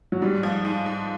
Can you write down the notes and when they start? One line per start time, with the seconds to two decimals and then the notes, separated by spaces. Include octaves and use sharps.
0.12 F#3
0.22 G#2 G3
0.43 F3
0.65 G#2
0.86 G#2